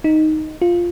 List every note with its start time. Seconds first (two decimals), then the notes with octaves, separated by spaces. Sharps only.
0.04 D#4
0.62 F4